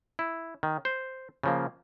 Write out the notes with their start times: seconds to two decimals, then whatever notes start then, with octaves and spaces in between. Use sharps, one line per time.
0.19 E4
0.63 D#3
0.85 C5
1.43 C#3 F3 A#3